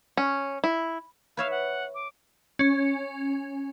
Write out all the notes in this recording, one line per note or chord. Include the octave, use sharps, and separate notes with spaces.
C#4
E4
B4 C#5 E5 F5
F#5
D6
C#4